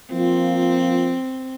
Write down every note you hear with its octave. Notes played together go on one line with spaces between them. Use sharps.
F3 A#3 C4 F4